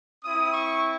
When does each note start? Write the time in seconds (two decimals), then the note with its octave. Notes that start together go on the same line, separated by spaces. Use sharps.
0.24 C4 E4 D#6
0.53 C#6